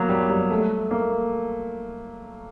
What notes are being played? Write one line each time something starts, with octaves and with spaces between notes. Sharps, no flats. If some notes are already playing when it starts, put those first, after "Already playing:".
Already playing: F#3 A#3 B3
G3
G3
A3
A#3